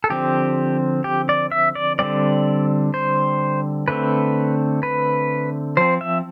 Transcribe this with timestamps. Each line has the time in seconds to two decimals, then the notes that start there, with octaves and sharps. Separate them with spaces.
0.04 A4
0.10 D3 F3 C4 G4
1.04 G4
1.29 D5
1.52 E5
1.75 D5
1.99 D3 G3 C4 D5
2.94 C5
3.88 D3 A3 C4 B4
4.83 B4
5.77 F3 C4 C5
6.01 E5